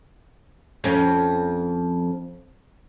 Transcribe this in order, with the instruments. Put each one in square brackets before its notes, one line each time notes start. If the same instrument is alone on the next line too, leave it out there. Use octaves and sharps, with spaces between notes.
[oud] F2 C#4